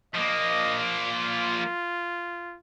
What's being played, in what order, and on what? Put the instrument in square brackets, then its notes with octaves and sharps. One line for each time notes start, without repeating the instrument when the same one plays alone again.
[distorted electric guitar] F3 A#3 [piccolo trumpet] D#5
[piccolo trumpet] F4